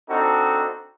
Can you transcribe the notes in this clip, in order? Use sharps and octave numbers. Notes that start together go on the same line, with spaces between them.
C4 D4 D#4 F#4 A4